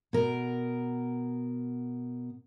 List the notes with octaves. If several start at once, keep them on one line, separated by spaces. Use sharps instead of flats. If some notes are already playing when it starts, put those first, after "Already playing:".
B2 A#4